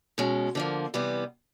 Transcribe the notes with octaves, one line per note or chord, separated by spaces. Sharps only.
B2 G#3 C#4
D3 F3 A#3
C3 E3 G3 B3